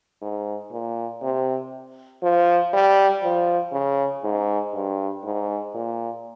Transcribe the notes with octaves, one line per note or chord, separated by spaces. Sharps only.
G#2
A#2
C3
F3
G3
F3
C#3
G#2
G2
G#2
A#2